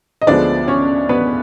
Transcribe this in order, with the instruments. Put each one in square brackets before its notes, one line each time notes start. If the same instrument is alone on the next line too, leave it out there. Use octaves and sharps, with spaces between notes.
[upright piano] D#5
D2 D3 F3 G#3 B3 D4 D5
C#4 C#5
B3 B4